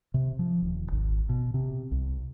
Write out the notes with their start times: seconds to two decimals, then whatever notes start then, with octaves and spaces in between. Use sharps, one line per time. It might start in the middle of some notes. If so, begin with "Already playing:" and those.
0.14 C3
0.39 F3
0.62 D#1
0.92 G#1
1.29 B2
1.54 C3
1.91 C2